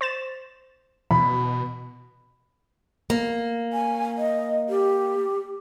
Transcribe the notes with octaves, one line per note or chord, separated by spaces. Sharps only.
C5 A6 E7
B2 E3 B5
A#3
G#5
D#5
G4